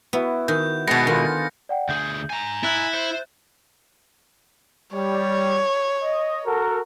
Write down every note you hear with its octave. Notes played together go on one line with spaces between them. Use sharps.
B3 E4 F#4
D#3 G6
B2 G#3 B3 G#5 C#6 A#6 C#7
D3 D#3 B3 F4 A#6
D5 F#5 G5
D2 G#4 G6
G#5 A#5
E4 E5 F#6 A6
C5
G3 C#5
D#5
F#4 A4 A#4